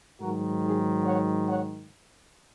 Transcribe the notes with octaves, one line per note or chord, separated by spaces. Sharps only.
G#2 D#3 F#3 F#4 A#4
D#4 G#4
C#5 F#5
C#5 F#5